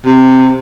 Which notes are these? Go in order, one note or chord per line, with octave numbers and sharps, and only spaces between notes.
C3